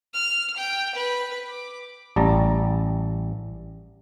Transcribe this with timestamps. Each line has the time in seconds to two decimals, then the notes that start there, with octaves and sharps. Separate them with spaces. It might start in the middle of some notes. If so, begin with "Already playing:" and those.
0.13 F6
0.56 G5
0.95 B4
1.49 D6
2.16 A1 G3 A5 A#5